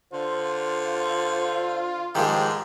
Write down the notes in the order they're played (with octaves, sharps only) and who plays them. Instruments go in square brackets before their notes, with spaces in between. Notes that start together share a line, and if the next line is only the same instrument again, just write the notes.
[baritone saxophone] D3 [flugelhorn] F4 [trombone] C5
[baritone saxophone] G#2 [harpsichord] D#3 F3 G#3 [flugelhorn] G4